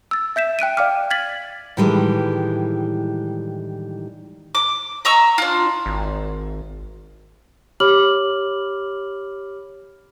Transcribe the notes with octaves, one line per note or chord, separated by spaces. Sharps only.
E6 A6
E5 G6 B6 E7
G5 F#6 D7 D#7
D5 F5 G5 D6 F6
F6 G#6 A6 B6 F#7
A2 D#3 E3 G3 G#3
D6
D#5 A#5 C#6 E6
D4 F4
G#1
G4 C#5 B5 D6 F6 F#7